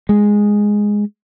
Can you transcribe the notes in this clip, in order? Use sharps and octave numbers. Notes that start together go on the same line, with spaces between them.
G#3